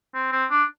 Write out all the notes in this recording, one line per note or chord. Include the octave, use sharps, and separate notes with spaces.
C4
C4
D4